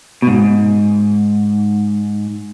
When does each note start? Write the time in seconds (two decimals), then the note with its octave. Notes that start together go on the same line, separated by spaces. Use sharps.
0.22 B2
0.27 G#2